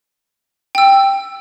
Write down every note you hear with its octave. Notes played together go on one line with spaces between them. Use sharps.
G5 E6